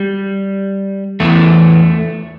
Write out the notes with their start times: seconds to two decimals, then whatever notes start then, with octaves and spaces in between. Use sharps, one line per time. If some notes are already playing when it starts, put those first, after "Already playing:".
Already playing: G3
1.20 E2 E3 A3